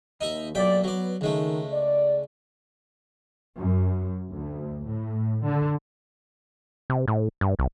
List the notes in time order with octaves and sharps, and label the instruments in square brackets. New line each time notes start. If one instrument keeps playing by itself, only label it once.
[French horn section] D#2 [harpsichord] D#4 E5 A#5
[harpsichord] B1 G5 B5 [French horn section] A#2 D5
[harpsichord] F#3 D5 [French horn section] B3
[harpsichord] C#2 G#3 A3 [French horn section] D#3
[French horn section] D5
[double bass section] F#2
D2
A2
D3
[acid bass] C3
A2
G2
C2